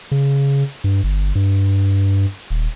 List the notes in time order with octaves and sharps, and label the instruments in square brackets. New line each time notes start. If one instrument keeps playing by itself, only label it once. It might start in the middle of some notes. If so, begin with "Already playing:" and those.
[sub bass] C#3
G2
G1
G2
D#1